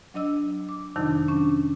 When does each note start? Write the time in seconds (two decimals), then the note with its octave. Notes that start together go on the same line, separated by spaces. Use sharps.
0.14 F#3 D4 D#5 E6
0.69 D6
0.96 F2 C3 D#3 F#3 D4 D#4
1.28 C#4 D4